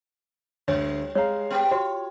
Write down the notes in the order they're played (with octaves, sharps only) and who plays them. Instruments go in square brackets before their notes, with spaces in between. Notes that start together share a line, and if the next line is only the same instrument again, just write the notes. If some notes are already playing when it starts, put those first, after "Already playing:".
[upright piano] D2 [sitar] G3 [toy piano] C#5
[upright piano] G#3 F5 [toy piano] C#5 A#5
[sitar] B3 G4 B4
[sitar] F4 [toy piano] F#4 [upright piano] C#5